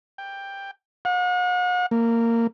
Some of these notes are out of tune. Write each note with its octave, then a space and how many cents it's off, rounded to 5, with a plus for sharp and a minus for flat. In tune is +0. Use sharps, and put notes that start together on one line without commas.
G5 +10
F#5 -45
A#3 -15